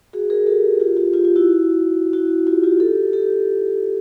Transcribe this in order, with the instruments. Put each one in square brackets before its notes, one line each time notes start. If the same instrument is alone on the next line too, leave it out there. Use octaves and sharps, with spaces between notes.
[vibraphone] F#4 G#4
G#4 A#4
G4 A4
F4 G4
F4 G4
F4 G4
F4
E4 F#4
E4 F#4
F4 G4
F4 G4
G4 A4
G4 A4